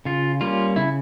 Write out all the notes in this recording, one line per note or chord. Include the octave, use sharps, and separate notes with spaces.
C#3 F4
G3 A#3 C#4 F4
C#3 E4